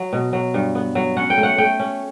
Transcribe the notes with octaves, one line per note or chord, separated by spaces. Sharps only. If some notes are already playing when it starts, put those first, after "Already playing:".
Already playing: F#3
B2
F#3
G2
B3
F#3
C#4 F#5
G5
A3
F#5
A3 G5
C#4